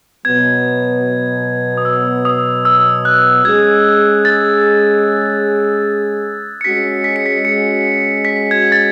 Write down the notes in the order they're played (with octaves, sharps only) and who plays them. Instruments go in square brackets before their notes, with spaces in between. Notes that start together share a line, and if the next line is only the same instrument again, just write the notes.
[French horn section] B2 F#3 B3 [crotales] G#6
[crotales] D#6
E6
D#6
E6
F#6
[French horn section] G#3 C#4 G#4 [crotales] G#6
[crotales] A6
C#7
[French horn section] G#3 C#4 F#4 [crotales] B6
[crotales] B6
C#7
B6
C#7
B6
G#6
A6